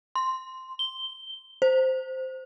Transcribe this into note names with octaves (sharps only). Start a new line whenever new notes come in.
C6
G7
C5